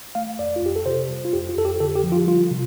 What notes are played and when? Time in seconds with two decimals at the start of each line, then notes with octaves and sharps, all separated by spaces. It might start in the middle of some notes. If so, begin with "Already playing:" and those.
0.15 A3 F5
0.39 F2 D5
0.56 F4
0.62 F2 G4
0.76 A4
0.86 C3 C5
1.09 G3
1.25 F4
1.33 F2 G4
1.49 F4
1.57 F2 A4
1.65 G4
1.80 D3 A4
1.96 G4
2.04 F3
2.12 F4
2.27 G3 F4
2.51 C3